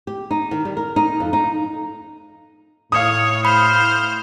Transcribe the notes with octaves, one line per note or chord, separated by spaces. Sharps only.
G4
D#4
D#3
G3
A#4
D#4
F2
D#4
A2 C#5 F5 D#6
C5 B5 F6